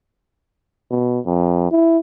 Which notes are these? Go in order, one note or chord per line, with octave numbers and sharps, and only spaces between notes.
B2
F2
E4